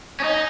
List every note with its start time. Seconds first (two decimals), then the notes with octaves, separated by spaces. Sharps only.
0.20 C#4
0.24 D#4